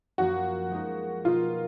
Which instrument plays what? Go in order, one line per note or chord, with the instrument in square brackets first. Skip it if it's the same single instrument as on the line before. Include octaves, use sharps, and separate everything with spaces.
[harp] F#2 F3 A#3 [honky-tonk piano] F#4
[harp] F3 G#3 D#4 A#4
[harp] B2 A#3 D#4 A#4 [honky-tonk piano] F4